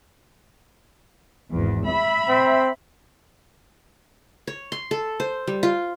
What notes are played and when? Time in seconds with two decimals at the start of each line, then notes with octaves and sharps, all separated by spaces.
1.50 G#1 E2
1.85 E5 B5
2.29 C4
4.47 C#5
4.72 C6
4.91 A4
5.20 C5
5.47 G3
5.63 F4